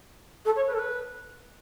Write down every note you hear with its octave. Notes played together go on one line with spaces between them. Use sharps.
A4
C#5
B4
A4
B4